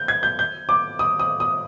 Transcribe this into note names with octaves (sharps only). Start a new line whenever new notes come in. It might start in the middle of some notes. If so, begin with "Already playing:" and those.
Already playing: G6
G#6
G6
G6
D6
D#6
D#6
D#6